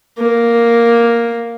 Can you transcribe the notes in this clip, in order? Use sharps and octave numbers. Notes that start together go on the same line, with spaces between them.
A#3